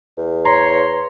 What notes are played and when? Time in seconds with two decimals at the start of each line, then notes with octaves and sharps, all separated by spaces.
0.17 E2
0.45 C#5 A#5 C6